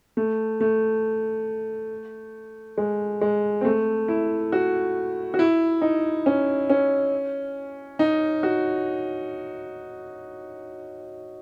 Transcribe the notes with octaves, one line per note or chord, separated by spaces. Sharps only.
A3
A3
G#3
G#3
C4
A3
E4
F#4
F#4
E4
D#4
C#4
C#4
D#4
F#4